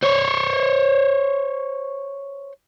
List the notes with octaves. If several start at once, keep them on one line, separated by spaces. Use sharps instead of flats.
C5 C#5